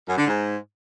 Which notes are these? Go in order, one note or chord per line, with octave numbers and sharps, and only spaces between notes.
F#2
D3
G#2